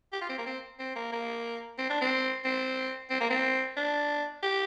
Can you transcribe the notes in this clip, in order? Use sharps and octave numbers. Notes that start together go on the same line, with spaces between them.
G4
F4
C4
A#3
C4
C4
A#3
A#3
C4
D4
C4
C4
C4
A#3
C4
D4
G4